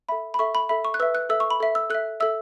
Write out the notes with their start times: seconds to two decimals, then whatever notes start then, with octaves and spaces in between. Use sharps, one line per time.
0.09 A4 E5 B5
0.34 B5
0.39 A4 E5 C#6
0.55 B5
0.69 A4 E5 B5
0.85 C#6
0.94 F#6
1.00 B4 E5 E6
1.15 F#6
1.29 A4 E5 E6
1.40 C#6
1.50 B5
1.60 A4 E5
1.75 E6
1.90 A4 E5 F#6
2.20 A4 E5 E6